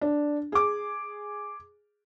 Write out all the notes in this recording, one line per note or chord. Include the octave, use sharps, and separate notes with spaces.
D4
G#4 D6